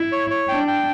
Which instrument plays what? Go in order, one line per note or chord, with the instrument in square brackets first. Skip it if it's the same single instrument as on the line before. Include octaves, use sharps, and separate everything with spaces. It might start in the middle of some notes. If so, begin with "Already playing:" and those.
Already playing: [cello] E4
[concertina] C#5
C#5
[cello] D4 [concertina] G5
[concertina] G5